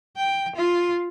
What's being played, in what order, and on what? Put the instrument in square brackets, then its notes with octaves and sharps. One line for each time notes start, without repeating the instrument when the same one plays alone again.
[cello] G5
F4